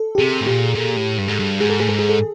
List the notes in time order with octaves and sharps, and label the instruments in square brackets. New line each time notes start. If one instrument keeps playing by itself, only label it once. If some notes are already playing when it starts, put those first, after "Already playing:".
Already playing: [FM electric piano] A4
G4
[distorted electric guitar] C3 [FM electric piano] G#4
[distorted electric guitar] A2
[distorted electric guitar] A#2 [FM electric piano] G4
[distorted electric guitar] A#2
A2
G2
G#2
G2
[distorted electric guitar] G#2 [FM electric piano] G#4
[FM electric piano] A4
[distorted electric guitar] A2 [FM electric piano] G#4
[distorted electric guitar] G#2 [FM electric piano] A4
[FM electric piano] G#4
A4